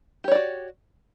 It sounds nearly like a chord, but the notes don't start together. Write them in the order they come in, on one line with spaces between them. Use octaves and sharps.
G4 C#5 D5 F#4